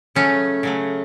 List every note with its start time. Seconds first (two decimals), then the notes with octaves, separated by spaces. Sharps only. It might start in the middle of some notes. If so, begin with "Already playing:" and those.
0.15 C#3 F#3 A3 C#4
0.63 C#3 F#3 A3